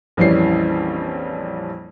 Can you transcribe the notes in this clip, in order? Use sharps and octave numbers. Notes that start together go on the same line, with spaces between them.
A#1 F2 E3 G3 C#4 C7